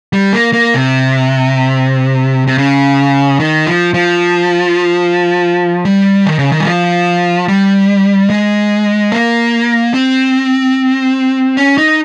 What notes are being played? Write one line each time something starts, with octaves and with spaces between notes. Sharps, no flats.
G3
A#3
A#3
C3
C3
C#3
D#3
F3
F3
G3
D#3
C#3
D#3
G3
F3
G3
G#3
A#3
C4
C#4
D#4